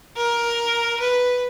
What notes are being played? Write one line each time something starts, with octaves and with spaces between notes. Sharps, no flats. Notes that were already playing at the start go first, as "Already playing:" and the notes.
A#4
B4